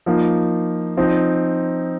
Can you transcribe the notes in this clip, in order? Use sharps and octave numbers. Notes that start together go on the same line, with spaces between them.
F3 A#3 D#4
F3 C4 D#4